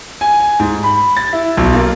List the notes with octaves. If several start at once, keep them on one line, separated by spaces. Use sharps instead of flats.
G#5
G#5
G#2
B5
A6
E4
B1
A#3